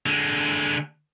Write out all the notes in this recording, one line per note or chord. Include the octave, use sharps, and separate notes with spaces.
D3 G#3